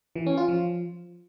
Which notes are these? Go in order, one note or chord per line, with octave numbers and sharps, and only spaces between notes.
E3
C#4
F4
F3